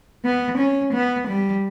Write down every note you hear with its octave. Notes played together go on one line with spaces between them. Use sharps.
B3
C#4
B3
G3